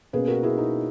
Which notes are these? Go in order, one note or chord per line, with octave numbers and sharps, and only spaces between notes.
B2 A#3 C#4 G#4 B4
F#4 A#4
E4 G#4
D#4